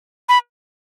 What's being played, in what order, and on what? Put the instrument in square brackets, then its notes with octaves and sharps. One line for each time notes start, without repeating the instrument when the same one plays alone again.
[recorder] B5